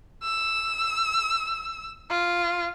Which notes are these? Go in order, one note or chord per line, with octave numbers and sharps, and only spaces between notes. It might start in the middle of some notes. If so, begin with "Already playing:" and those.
E6
F4